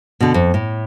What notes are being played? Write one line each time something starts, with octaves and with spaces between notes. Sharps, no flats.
B2 D3
F2
A2